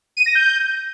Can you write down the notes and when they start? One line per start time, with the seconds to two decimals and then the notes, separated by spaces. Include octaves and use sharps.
0.17 D#7
0.26 A#6
0.35 G6